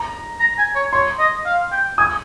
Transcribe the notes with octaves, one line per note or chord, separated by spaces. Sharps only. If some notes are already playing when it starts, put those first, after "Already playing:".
Already playing: A#5
A#5
G#5
C#5
C#5 C6
D#5
F5
G5
G#5 D#6